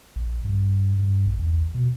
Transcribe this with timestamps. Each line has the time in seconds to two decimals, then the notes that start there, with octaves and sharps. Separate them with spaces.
0.16 A#1
0.45 G2
0.99 G2
1.26 A#1
1.39 E2
1.75 B2